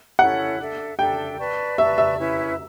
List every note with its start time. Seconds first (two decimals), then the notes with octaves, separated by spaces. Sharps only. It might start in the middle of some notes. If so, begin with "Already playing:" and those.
0.19 C#4 E4 A4 C#5 F#5
0.59 D4 A4 E5
0.98 D4 A4 E5 G5
1.38 B4 D5 A5 C#6
1.78 B4 D5 E5 A5 C#6
1.98 E5
2.18 C#4 E4 B4 E5